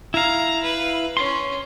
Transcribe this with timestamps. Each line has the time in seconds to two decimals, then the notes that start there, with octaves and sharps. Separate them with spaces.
0.14 E4 F5 A#5
0.63 B4
1.17 C#4 C6